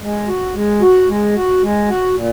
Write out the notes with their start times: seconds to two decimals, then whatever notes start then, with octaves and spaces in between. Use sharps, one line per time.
0.02 G#3
0.28 F#4
0.55 G#3
0.81 F#4
1.08 G#3
1.35 F#4
1.63 G#3
1.88 F#4
2.15 A#2